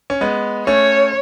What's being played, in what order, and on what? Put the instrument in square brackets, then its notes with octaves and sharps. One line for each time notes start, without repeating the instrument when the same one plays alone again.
[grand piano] C#4
G#3 B3
[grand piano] A3 C#4 [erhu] C#5